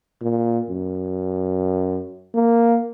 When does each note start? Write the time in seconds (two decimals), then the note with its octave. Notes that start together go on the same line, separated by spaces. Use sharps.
0.21 A#2
0.70 F#2
2.34 A#3